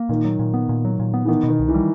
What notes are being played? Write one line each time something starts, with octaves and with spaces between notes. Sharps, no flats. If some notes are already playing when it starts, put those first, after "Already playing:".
Already playing: A#3
A#2 D#3
F#3
A#2
B3
A#2
F#3
A#2
B3
E3
D#3 B3
B2 D#3
C2
E3
G3